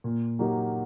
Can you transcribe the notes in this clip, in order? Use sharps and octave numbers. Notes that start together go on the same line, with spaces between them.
A#2
F#3 A#3 D#4 G4